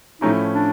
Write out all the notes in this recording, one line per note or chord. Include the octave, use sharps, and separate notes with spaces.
A2 F3 A3 C#4 D#4 E4
D4